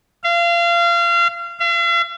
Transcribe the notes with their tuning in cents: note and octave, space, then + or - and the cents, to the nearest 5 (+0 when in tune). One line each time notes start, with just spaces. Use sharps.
F5 -30
F5 -45